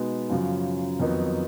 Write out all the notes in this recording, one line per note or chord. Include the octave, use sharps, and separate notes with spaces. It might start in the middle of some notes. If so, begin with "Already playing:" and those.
Already playing: B2 G#3 B3 D#4
F#2 C#3 F3
F2 D#3 F#3 B3 D#4